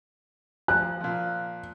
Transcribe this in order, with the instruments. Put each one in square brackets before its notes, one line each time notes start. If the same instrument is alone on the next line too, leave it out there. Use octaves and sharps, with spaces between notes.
[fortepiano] F3 [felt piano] F#6
[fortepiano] A#2 F3